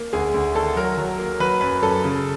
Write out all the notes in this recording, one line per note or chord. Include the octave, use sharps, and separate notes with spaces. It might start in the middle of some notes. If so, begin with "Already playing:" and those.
Already playing: A#3
D2 G#4
D2
D#3 A4
F#3 A#4
F#3
A#3
F#3 B4
F#2 B4
F#2 A4
C#3